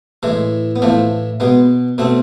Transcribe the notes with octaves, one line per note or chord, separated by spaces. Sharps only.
A2 E3 G#3
B3
A2 E3 F3 A3
B2 G#3 B3
B2 A3 C4